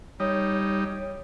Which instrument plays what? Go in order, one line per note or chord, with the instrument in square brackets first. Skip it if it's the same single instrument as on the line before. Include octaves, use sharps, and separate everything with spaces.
[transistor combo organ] G3 D#4 [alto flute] C#5